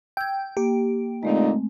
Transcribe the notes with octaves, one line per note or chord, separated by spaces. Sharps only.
G5 E6 G#6
A#3 G4
A#2 D3 G#3 A3 C4 D#4